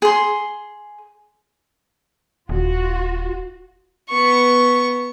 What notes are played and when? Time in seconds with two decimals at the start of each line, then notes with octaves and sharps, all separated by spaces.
0.02 G#4 C6
2.49 D#1 F4 F#4
4.09 B3 C#6